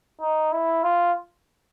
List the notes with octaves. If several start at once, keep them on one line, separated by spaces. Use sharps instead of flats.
D#4
E4
F4